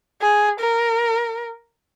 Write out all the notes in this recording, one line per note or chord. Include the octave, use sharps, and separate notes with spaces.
G#4
A#4